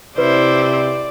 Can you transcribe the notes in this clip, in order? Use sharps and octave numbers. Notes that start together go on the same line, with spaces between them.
C3 E4 B4 C5 D5